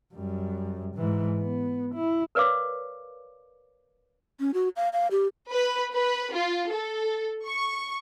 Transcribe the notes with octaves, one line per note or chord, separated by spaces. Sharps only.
F#2 G3
G#2 E3
B3
E4
A#4 B4 C#5 D5 F5 D6
C#4
F#4
F5
F5
G4
B4
B4
F4
A4
C#6